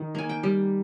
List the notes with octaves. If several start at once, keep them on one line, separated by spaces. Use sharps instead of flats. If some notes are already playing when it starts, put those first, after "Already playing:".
Already playing: D#3
A#3 G#5
G5
G3